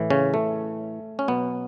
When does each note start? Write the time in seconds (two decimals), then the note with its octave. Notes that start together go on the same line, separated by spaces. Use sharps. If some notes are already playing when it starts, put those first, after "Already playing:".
Already playing: A2 E3
0.10 C#3 C#4
0.34 A3
1.19 C#4
1.28 B2 F#3 B3